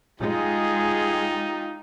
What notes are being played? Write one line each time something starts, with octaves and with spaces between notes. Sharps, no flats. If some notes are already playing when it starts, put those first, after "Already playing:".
G#3 D#4 F4 G4 G#4